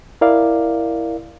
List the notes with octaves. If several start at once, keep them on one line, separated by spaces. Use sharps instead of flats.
E4 A#4 D5 F5